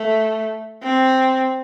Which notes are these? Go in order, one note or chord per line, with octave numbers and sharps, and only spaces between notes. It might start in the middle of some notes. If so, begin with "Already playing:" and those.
Already playing: A3
C4